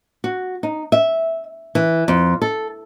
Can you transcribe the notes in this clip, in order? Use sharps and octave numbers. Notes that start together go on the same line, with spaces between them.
F#4
D#4
E5
E3
F2
A4